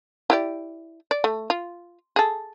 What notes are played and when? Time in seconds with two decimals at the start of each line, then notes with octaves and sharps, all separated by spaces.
0.30 E4 G4 D5
1.11 D5
1.24 A3
1.50 F4
2.16 G#4 A4